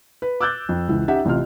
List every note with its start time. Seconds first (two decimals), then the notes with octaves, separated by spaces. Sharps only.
0.22 B4
0.41 D6 E6 F#6 G6 A6
0.69 F2
0.88 C#2 E3
1.08 C#4 D#4 G4 E5 F#5
1.25 A1 C3 F4 F6